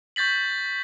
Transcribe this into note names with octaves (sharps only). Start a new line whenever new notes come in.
C#6 G6 A6 B6 F#7